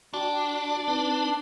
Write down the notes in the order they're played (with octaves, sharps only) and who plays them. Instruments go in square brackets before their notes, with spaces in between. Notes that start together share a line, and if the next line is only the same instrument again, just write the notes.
[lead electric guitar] D4 [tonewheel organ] F#4 G5
[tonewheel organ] C4 D#4 B4